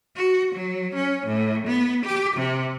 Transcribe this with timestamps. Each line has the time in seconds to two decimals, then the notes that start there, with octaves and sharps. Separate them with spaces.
0.16 F#4
0.55 F#3
0.95 C#4
1.26 A2
1.67 B3
2.05 G4
2.37 C3